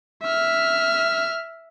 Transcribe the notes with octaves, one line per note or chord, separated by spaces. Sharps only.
E5 F6